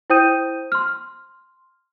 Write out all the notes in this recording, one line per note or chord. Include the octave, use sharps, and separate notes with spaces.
E4 C5 G5 D#6 G6 D#7
C6 F6